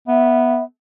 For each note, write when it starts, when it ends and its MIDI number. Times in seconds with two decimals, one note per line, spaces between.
0.08 0.61 59
0.08 0.64 76